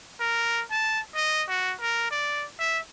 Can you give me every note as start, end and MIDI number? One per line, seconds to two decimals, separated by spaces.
0.20 0.62 70
0.71 1.00 81
1.15 1.43 75
1.49 1.74 66
1.80 2.10 70
2.11 2.46 74
2.59 2.79 76